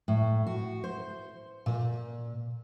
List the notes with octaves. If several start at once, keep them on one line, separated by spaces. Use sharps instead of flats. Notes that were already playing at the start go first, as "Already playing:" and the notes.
A2
F#4
C5
A#2